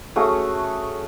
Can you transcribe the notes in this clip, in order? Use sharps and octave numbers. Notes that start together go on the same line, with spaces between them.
A3 C#4 F#4 G#4